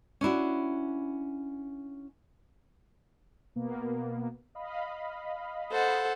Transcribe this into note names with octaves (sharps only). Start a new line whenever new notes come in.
C#4 D4 E4 F#4
B2 A#3 B3
D#5 F5 B5
A4 C5 F#5